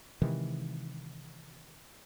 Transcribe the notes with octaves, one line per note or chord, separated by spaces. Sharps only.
C3 D#3 E3 G#3